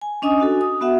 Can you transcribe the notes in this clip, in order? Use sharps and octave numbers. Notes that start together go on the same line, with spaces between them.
G#5
C#4 D4 D#5 G#5 D#6
D4 F#4 A4
D#6
B3 F#4 E5 F#5